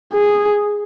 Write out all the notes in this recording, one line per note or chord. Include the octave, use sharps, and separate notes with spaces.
G#4